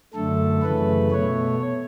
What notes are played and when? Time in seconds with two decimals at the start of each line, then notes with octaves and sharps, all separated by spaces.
0.14 F#2 D3 A3 A4
0.62 F#2 C#3 E3 A3 B4
1.11 B2 A3 C#5